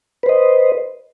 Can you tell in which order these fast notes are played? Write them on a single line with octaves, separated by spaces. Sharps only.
B4 C5 D#5